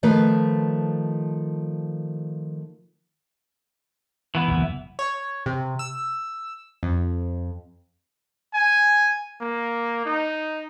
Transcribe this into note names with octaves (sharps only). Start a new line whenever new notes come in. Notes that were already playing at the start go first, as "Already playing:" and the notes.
D#3 F3 A3 B4
E3 B3 E4
F#1 D2 C3
C#5
C3
E6
F2
G#5
A#3
D#4